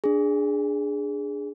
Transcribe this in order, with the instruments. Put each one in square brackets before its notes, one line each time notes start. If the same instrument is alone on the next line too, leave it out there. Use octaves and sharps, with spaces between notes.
[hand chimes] D4 G#4